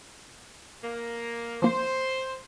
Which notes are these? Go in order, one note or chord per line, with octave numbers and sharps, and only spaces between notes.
A#3
F3 A#3 C5